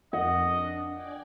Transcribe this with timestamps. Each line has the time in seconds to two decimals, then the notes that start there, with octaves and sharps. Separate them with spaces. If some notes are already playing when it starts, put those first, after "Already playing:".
0.13 F2 D#5 F#5
0.52 D4
0.92 D5 G5 G#5